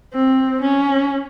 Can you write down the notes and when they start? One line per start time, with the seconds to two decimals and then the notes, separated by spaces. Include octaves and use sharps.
0.13 C4
0.62 C#4